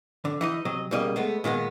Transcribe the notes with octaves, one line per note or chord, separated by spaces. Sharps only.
D3
E3 D#4 D#5
C3 F#3 D#5
B1 C#3 G3 A#3 D#5
G#3 A3 B3
A#2 D#3 G#3 B3